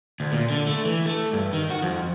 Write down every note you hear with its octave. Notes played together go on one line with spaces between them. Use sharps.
D2
A#2
D3
A3
E3
A3
G2
D#3
F#4
F2